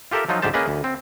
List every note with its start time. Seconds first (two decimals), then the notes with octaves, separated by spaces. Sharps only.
0.11 F4 G4 A4 A#4 E5
0.29 F3 F#3 D#4 F4
0.42 D2 G#2 G4 C5 A5
0.54 A#3 C#4 G#4 B4 D5 D#5
0.68 D2
0.84 C4